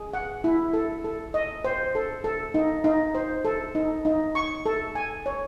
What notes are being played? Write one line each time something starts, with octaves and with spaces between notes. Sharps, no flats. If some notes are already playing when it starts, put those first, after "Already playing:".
Already playing: G#4
F#5
E4
A4
A4
D#5
C5
A4
A4
D#4
D#4
C5
A4
D#4
D#4
C#6
A4
G#5
C#5